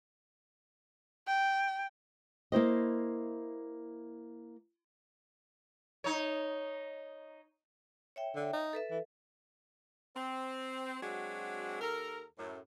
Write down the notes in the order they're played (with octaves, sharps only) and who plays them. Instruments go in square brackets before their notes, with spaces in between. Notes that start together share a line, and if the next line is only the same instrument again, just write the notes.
[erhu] G5
[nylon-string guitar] A#3 E4 C5 D#5
[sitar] D#4 C#5
[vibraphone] C#5 E5 G5
[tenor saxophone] D3
D#4
[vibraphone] A4 B4 E5
[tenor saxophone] E3
[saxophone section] C4
F#3 G#3 C4 D4 F#4
D#2 A4 A#4
F#2 A2